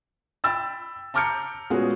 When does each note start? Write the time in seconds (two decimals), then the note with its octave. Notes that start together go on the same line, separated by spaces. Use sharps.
0.44 G5 B5 E6 A6
1.14 A5 A#5 D6 F6 G6 C#7
1.70 A#2 G#3 B3 C#4 F#4 G#4